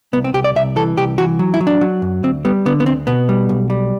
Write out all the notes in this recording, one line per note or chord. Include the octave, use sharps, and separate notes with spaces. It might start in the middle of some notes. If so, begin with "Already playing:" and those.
C2 B3
C4
C2 G4
D5
C2 E5
E3 A4
C2 G4
E3 F#4
F#3
E4
F#3
D4
F#3
F#2
D2 C4
G3 B3
D3 B3
B3
D2 C4
B2 B3
G3
B1
G3